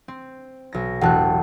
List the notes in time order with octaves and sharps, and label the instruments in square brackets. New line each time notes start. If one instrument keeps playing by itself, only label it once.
[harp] C4
B1 A#6
[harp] E1 A1 F#6 [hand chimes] F#5 G5 A5